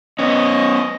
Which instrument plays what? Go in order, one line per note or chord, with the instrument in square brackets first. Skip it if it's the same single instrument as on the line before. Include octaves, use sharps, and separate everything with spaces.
[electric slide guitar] B3 C#4 [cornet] D#5